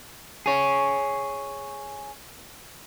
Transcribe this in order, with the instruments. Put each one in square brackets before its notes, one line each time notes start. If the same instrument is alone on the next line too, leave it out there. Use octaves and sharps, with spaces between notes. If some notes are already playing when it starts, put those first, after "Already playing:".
[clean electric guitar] G#4 C#5